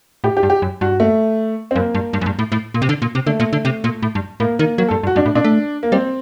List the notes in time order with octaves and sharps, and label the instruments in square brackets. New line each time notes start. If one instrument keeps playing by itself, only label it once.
[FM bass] A2 [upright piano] G4
[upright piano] G4
[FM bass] G2
[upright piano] G4
[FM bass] F#2
[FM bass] G2 [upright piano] F#4
[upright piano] A3
C4
[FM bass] F#2 [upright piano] A#3
[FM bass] G2
G2
F#2
G2
A2
A2
A#2
C3
D3
A#2
C3
[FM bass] D3 [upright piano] A3
[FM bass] A#2
D3
C3
A#2
A2
G2
[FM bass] A2 [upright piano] A#3
[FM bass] D#3 [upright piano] A#3
[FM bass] F#3 [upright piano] A#3
[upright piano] A4
[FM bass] G2
G2
[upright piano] F#4
[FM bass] G2 [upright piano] D4
[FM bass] A2
[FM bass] A#2 [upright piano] D4
[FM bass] A3
[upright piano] A#3
[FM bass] G3 [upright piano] C4